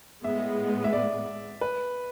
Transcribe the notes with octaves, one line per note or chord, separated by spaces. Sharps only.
A2 G#3 B3 E5
E5
D5
B4